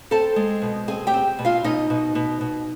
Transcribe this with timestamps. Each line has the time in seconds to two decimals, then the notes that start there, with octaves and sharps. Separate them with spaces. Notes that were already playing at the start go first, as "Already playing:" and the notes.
0.11 C4 A4 A5
0.36 G#3
0.62 B2
0.88 C4 G#4 G#5
1.07 G4 G5
1.14 C4
1.39 B2
1.45 F4 F5
1.64 B2 D#4 D#5
1.90 B2
2.15 B2
2.41 B2